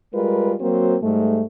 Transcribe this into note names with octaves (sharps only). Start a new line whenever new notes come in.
G3 G#3 F4 A#4 B4
F#3 A#3 C4 F#4 C5
G#2 G3 A3